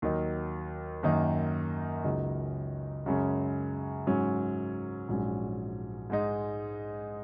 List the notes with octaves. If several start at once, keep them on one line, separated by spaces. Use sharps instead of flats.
D#2 D#3 F#3 D#4
F#2 D#3 A#3 D#4
C#2 C#3 F#3 D#4
F#2 C#3 G#3 C#4
G#2 F#3 C#4
A#1 G#2 F#3 C#4
G#2 G#3 D#4